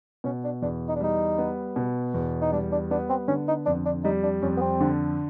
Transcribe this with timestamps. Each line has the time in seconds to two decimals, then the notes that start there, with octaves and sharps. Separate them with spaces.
0.24 B2 C#4
0.44 D4
0.62 E2 D4
0.88 D#4
0.96 D4
1.00 G3 D#4
1.38 B3
1.76 B2
2.14 E2
2.41 D#4
2.52 G3 D4
2.72 D4
2.91 B3 D4
3.09 C4
3.28 D3 C#4
3.48 D#4
3.66 F2 D4
3.85 D4
4.04 G3 D#4
4.23 D4
4.42 F2 C#4
4.57 B3
4.61 C4
4.81 D3